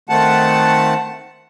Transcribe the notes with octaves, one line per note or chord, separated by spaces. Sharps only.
D#3 A3 C4 F#5 A5